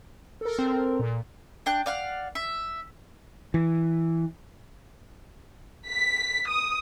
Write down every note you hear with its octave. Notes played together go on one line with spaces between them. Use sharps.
A4 A#4
C4
A#2
D4 G5 F#6
D5 F5 F#5
E5
E3
B6
D#6